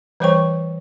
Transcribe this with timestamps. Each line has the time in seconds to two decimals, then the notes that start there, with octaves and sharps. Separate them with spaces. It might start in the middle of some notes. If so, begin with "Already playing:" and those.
0.20 E3 G3 C5 C#5 G5 C#6